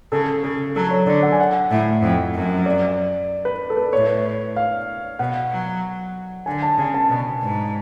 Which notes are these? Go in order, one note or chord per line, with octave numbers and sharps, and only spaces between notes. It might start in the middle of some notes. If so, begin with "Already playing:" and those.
C#3 A4
C#3 A4
F#3 A4
C#5
D3 D5
F#5
G#5
F#5
A2
F2
F#2
D5
B4
A4
B4
A2 C#5
F5
B2 F#5
F#3
D3 G#5
A5
C#3 G#5
A5
B2
G#2